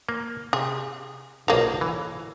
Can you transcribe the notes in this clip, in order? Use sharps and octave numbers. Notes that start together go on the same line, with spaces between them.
A#3
C3 G#4
B1 F3 A#3 G#4 A#5
E3